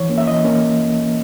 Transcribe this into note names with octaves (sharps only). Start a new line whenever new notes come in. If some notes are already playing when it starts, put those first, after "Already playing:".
Already playing: E3 C#5
A#3 C#4
E5
E3 D#5
A#3 C#4